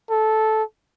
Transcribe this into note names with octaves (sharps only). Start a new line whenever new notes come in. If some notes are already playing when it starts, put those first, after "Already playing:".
A4